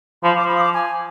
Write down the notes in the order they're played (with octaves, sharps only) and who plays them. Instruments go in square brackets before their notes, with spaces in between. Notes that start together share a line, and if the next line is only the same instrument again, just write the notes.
[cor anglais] F3 [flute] B5
[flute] D6
[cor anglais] F3
[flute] B5
D#6
D6
G#5